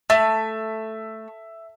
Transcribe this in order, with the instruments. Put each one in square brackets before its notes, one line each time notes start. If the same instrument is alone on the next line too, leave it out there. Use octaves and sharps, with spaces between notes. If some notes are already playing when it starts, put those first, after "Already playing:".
[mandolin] A3 [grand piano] E5